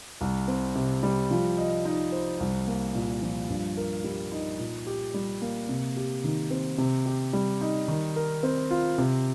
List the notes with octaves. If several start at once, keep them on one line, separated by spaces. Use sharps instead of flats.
C2
C4
C3
G3
F3
D#5
D#4
C5
C2
A#3
A#2
F3
G2
A#4
G3
D#4
A#2
G4
G3
A#3
C3
G4
D#3
C4
C3
G4
G3
D#4
D#3
A#4
C4
F4
C3